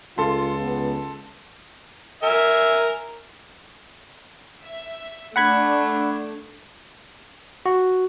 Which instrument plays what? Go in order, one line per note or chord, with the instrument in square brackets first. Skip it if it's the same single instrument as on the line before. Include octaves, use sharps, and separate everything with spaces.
[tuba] C#2 [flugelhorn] F4 [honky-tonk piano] A4 C6
[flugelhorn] B3
[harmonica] A#4 E5 G#5
[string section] E5
[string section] A3 D4 [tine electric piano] F#5 B5 G#6
[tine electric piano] F#4